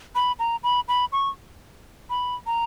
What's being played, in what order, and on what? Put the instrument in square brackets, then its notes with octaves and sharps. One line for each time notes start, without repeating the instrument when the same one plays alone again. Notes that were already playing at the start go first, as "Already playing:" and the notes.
[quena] B5
A#5
B5
B5
C#6
B5
A#5